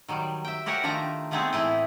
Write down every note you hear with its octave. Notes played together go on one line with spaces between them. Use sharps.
D#3 F#3 G3
E5 G5
F#4 G4 A#4 C#5 F#5 G#5
D#3 F3 A3 D4 A#5
G#3 A3 B3 C4 D#4 G#4
A2 E3 E4 D#5